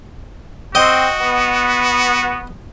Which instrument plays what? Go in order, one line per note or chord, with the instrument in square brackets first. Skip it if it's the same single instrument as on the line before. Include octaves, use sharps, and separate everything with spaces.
[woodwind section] C4 [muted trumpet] F#4 [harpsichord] D#5 G5
[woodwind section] B3